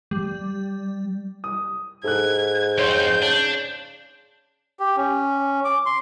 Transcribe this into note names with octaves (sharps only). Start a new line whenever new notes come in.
G3
D#6
G#2 A4 F#6 G#6
F2 C4 C#5 C6 G6
C#3 D4
G4
C#4
D6
C6